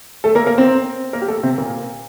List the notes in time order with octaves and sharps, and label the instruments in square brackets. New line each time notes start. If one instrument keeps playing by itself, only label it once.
[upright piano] A3 A4
A#3 A#4
A#3 A#4
C4 C5
A#3 A#4
G4
A3 A4
C3 C4
A#2 A#3